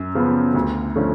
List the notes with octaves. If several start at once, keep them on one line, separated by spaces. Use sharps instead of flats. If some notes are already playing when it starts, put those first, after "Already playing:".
Already playing: F#2
C#3 F3 B3
D2
D3 F3 A3 C#4